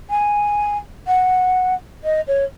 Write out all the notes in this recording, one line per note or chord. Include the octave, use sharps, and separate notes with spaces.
G#5
F#5
D#5
C#5